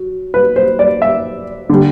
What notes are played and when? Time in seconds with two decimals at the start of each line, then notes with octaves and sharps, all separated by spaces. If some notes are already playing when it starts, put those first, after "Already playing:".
Already playing: F#3
0.34 B4
0.56 C5
0.79 D5
1.02 E5
1.70 D3 G3